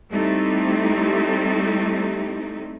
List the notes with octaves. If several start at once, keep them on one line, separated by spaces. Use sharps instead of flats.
G3 A3 C4 D#4 E4 G4